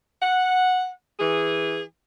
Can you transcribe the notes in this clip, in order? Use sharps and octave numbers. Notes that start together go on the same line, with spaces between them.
F#5
E3 G#4